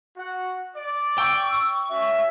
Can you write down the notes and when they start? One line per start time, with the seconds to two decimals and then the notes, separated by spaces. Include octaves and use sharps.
0.17 F#4 F#5
0.77 D5
1.18 G5 C#6 E6
1.54 C#6
1.90 C#4 F#4 E5